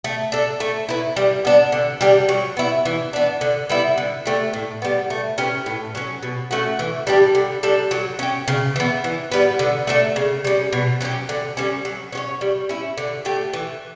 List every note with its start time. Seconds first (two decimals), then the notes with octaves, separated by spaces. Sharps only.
0.04 A3
0.32 D4 A4
0.60 A3
0.89 E4 B4
1.16 G3
1.45 B3 D4
1.72 D3
2.01 G3 D4 G4
2.29 F#3
2.57 B3 E4
2.85 E3
3.13 B3 D4
3.41 D3
3.69 G3 B3 E4
3.98 D3
4.26 A3 D4 G4
4.53 A2
4.82 G3 B3
5.10 A3
5.38 C#4 G4 B4
5.66 A2
5.95 F#3 C#4
6.23 B2
6.51 A3 C#4 F#4
6.79 E3
7.07 G3 D4 G4
7.35 D3
7.63 G3 D4 A4
7.91 F#3
8.19 C#4 G4
8.48 C#3
8.76 E3 B3
9.04 E3
9.32 G3 B3
9.59 D3
9.87 A3 D4 A4
10.16 C#3
10.45 G3 C#4
10.73 B2
11.01 F#3 C#4 G4
11.29 D3
11.57 G3 C#4
11.85 F#3
12.12 C#4 F#4 C#5
12.41 G3
12.69 C#4 E4
12.98 D3
13.25 A3 D4 G4
13.53 E3